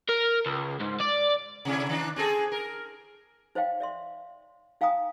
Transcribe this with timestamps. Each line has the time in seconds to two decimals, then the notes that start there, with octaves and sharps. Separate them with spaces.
0.09 A#4
0.46 C#2
0.81 G#2
1.01 D5
1.65 C3 A3 E4
1.89 D#3 D4
2.16 C4 G#4 A4
2.52 A#4
3.55 D#4 C5 C#5 D#5 F5 G5
3.80 D5 E5 C6
4.81 D#4 F5 G5 G#5 A#5 D#6